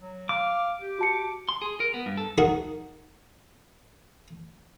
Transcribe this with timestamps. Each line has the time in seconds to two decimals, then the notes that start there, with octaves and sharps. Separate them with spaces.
0.02 F#3
0.29 F5 D6
0.82 G4
0.99 F#4 A5 C#7
1.49 C6
1.62 G#4
1.80 A#4
1.94 B3
2.06 G2
2.17 A4
2.38 D#4 F#4 G#4 A#4 F#5